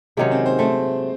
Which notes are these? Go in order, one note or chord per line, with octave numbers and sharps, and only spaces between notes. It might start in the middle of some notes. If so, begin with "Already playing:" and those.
C3 D#3 F#3 G#3 C#4 G#4
C4 C5
C4 C5
A3 C4 C5